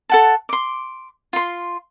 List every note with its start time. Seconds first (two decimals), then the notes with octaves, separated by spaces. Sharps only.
0.09 A4 F#5 A5
0.49 C6 D6
1.33 F4 C6